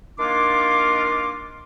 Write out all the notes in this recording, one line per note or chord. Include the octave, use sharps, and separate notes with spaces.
D#3 A#3 D4 F4 C6 D6